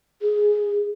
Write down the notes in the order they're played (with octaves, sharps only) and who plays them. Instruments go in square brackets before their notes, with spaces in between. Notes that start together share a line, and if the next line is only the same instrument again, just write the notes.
[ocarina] G#4